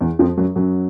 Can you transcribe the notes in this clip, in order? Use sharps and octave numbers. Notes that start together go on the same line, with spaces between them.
E2 E3
F2 F3
F#2 F#3
F#2 F#3